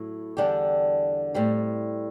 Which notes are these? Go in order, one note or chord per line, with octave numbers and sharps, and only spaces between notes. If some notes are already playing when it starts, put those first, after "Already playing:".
Already playing: A2 F#3 E4
E2 D3 G3 D4 G4
A2 G3 C4